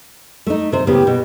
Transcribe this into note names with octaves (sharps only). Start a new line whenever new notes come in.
A3 D#4
C3 C5
A2 C#3 B3 G4
B2